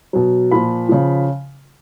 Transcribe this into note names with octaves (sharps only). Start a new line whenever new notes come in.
B2 F#3
A#2 F3 B5
C#3 F3